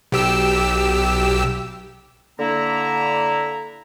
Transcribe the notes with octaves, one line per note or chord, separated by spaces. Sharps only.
B1 G4 E6
D3 A#3 E4 A#5